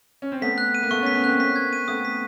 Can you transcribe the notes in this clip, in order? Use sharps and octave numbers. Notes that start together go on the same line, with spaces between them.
C#4
C4
A3 B3 B6
F#6
D#7
A#3
A3 B3 C#6
B3 C#4
B6
B3 C#4
A#3 C4 F#6
A#3 C4 B6
G#6
D#7
A3 B3 D#6
B6